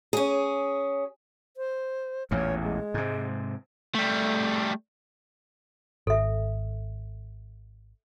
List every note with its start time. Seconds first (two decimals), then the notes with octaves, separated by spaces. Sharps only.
0.13 C#4 G#4
1.57 C5
2.31 A1 E2 A#2 C#5
2.64 G#3
2.94 G#2 C3
3.95 G3 A3
6.07 G#1 A4 E5